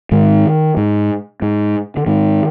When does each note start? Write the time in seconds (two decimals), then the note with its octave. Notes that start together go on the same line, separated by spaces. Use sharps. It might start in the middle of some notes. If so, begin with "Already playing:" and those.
0.12 G#2 D#3
0.77 G#2
1.42 G#2
1.97 D3
2.06 G#2 D#3